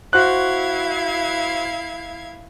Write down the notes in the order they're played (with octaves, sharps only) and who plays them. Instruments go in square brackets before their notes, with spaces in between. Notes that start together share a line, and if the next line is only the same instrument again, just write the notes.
[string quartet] E4 F5 G#6 [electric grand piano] F#4 C5 F#6